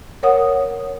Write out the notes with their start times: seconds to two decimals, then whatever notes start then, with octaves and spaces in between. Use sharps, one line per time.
0.23 A#4 C#5 F#5 D#6